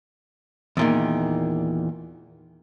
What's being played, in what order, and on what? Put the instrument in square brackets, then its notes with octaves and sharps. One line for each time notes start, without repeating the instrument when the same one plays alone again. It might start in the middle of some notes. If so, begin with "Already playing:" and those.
[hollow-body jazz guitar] E2 A#2 D#3